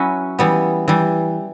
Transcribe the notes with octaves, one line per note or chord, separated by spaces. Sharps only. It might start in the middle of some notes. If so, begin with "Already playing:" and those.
Already playing: F#3 C#4 E4 B4
E3 G3 B3
E3 G3